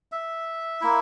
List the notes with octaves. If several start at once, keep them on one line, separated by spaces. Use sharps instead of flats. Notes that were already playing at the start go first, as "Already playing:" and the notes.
E5
A#3 E4